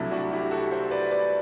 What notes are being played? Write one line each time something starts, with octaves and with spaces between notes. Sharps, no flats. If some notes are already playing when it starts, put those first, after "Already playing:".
Already playing: C2 C3 F#3 A3 D4 E4
D4 F#4
E4 G4
F#4 A4
C5 E5
B4 D5
B4 D5